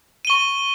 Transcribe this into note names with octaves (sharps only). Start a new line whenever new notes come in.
C#6 D#7 G7